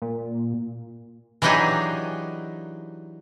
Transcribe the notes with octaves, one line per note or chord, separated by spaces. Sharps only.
A#2
E3 F#3 D4 D#4 G4 G#4